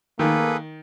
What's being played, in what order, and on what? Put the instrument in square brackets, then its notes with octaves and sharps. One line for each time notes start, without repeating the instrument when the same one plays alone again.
[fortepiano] D#3 [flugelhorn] A#3 [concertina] G#4 A4 B4